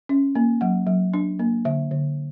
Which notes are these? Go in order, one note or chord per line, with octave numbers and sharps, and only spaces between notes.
C#4
A#3
F#3 F#5
F#3
D4
A#3
D3 E5
D3